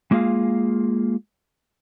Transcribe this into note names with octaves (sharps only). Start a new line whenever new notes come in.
G#3 A#3 F4 G#4 F5